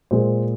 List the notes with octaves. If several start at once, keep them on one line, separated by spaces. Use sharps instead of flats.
A#2 G#3 C5